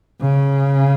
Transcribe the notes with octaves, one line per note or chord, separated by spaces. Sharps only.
C#3